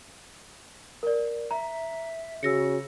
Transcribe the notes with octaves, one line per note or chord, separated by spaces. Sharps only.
A#4 D5
E5 A#5
C#3 F#4 E6 A#6 C#7